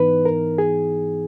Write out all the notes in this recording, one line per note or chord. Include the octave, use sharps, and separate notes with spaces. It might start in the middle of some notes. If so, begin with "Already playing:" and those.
Already playing: G#2 E3 B3 D#4 B4
A#4
G#4